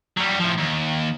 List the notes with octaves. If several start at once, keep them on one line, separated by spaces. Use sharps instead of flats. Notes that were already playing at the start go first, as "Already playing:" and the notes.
F#3 G3
A2 F3
D#2